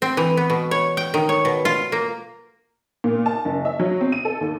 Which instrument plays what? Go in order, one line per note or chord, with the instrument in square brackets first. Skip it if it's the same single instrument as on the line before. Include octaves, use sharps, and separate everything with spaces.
[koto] C4
E3
B3
B2
C#5
G5
D#3
C#5
B2
F4
A#3
[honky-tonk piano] A#2
A5
F#1
E5
F#3
C4
D#7
A4
D#2